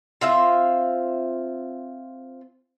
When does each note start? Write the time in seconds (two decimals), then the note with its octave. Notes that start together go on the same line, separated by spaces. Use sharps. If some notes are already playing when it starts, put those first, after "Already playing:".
0.21 C4 F4 E5